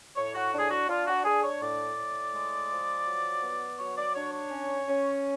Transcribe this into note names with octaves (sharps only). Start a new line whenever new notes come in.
A2 C#5
F#4
D4
G#4
F#4
D4 F4
F#4
D4 G#4
C#5
A2 D5
A2
G#3
F3
F#3
B3
F#3 C#5
D5
D4 C#5
C#5
C#4
C#4